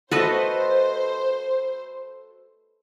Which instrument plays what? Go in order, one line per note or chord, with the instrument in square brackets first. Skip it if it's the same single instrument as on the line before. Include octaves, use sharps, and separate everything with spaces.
[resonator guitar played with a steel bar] A3 F#4 [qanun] A4 B4 D#5 [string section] C5